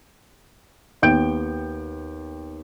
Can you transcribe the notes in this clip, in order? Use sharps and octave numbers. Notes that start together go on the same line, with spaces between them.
D#2 B3 G5 G6 D7